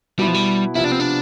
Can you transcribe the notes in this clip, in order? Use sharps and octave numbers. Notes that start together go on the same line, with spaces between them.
B2 G3 B3 E4
F3
G3
C3 F3 B3 E4 F4
D4
C4
D4